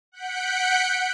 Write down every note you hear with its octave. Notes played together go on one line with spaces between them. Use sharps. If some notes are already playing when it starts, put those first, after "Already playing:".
F#5 F#6 G6 B6 C#7 D7